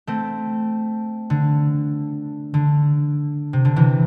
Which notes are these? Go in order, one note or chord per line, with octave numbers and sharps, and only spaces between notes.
A3 C4
D3
D3
C3
D3
C3 E3